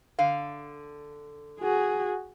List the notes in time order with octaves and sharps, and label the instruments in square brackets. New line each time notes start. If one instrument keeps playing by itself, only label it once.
[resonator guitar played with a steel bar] D3 F5
[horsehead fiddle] F#4 G#4